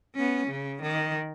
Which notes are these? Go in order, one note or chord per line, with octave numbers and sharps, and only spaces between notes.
B3 C#4
C#3
D#3